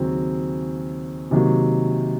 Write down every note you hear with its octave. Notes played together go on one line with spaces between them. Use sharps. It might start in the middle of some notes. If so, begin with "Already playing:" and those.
Already playing: D#2 C#3 F#3 C4
C3 D#3 F#3 A#3